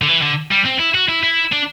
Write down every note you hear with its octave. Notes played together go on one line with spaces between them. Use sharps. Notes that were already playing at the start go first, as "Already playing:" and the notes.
D3
E3
D3
G3
C4
E4
F#4
E4
E4
D4